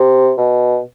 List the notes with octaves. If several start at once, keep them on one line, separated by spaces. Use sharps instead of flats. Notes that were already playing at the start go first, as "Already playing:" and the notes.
Already playing: C3
B2